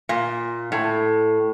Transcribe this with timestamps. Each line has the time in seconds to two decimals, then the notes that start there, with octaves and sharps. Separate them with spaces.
0.09 A#2
0.72 A2